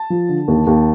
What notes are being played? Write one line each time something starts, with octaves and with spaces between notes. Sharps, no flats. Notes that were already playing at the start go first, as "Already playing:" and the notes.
Already playing: A5
F3
D3
D#2
D#2